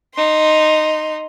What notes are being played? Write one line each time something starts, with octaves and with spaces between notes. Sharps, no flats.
D#4 C6